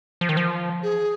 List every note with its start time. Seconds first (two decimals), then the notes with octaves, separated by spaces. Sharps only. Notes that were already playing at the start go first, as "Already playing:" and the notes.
0.21 F3
0.29 D#3
0.37 F3
0.83 G#4